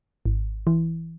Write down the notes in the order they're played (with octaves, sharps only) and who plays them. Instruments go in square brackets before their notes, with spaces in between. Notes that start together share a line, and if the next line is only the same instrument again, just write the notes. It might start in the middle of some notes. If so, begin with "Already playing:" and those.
[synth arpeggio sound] G#1
E3